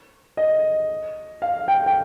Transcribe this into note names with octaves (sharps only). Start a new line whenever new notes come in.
D#5
F5
G5
G5